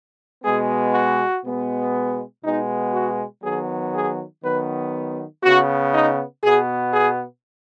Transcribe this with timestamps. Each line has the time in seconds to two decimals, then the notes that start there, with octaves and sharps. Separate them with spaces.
0.43 B2 G#3 B3 G#4
0.94 F#4
1.44 B2 G#3 B3
2.44 B2 G#3 B3 D#4
2.94 F#4
3.43 D#3 F#3 B3 G#4
3.94 G#4
4.43 D#3 F#3 B3 B4
5.44 C#3 B3 F#4
5.94 D#4
6.43 B2 B3 G#4
6.94 G#4